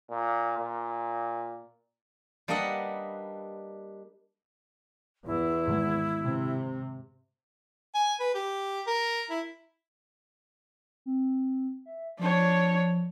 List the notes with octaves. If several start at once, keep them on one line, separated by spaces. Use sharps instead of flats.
A#2
A#2
G3 A#3 D4 B4 D#5 F#5
E2 E4
G#2 D#3 G#3
C3
G#5
B4
G4
A#4
E4
C4
E5
F3 D4 C#5